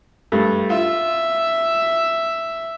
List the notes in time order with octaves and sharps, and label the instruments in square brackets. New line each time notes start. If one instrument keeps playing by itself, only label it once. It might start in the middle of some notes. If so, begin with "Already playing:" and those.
[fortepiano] G2 A3
[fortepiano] F4 [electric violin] E5